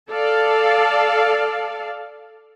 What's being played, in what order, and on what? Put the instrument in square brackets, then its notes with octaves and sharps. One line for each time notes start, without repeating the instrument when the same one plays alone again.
[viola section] A4 D5 F5